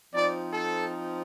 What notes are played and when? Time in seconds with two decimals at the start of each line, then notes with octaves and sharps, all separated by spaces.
0.14 F3 C4 D#4 D5
0.51 A4